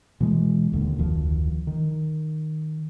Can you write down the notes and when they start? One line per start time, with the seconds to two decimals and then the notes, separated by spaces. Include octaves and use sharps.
0.20 B2 E3 G#3
0.72 D#1 D#2 D3
0.99 F1 D2 D#3 F3
1.67 D#3